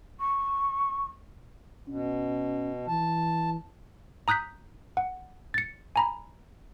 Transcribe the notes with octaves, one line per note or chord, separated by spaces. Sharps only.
C#6
B2 C#4
E3 A5
A#5 D#6 F#6 G6 B6
F#5
A6 C#7
G#5 A#5 B5